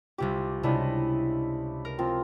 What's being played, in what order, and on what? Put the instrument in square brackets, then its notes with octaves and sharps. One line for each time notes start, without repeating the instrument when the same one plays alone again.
[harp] C2 C3 D6 [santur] F4 G4
[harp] C#2 C3 [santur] D4 E4 D#5
[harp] A#4
[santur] F3 C4 F4